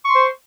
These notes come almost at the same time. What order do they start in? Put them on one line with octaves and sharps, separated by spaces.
C#6 C6 C5